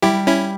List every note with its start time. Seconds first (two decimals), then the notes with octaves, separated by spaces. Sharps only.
0.02 G3 E4 G4
0.27 C#4 E4